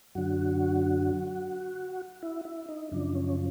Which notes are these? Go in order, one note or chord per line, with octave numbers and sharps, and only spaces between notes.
F#2 D3 F#3 F#4
E4
E4
D#4
F#2 C#3 F3 D4
C#4